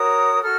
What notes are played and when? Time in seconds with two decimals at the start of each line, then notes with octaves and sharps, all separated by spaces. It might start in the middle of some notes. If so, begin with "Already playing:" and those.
Already playing: F#4 A#4 C#5 D#6
0.43 F#4 A4 F6